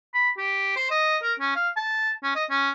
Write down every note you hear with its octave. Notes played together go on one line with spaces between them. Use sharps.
B5
G4
C5
D#5
A#4
C#4
F5
A5
C#4
D#5
C#4